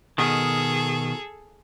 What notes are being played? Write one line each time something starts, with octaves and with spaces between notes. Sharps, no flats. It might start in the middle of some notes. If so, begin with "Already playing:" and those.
B2 D#3 G#4 A4